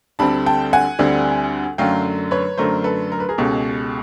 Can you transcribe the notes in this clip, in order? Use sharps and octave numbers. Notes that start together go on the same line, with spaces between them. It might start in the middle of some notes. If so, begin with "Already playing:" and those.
D2 D3 G3 C4 A5 B5
G5 A5
F#5 G#5
D2 D3 G3 C4
F#2 D3 F#3 A3 F5 G5
B4 C#5
F#2 D3 F#3 A3 A#4 C5
A4 B4
A#4
B4
G#4 A#4
C#2 B2 G#3 C#4 G4 A4